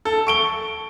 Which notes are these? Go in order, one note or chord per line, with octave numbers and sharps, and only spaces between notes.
A4
C#6 D7 G7